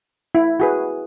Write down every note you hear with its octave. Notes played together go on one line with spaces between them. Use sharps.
E4
F#4 G#4 B4